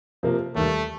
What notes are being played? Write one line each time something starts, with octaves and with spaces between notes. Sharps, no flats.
C3 F3 A#3
D#2 D#3 G3 A3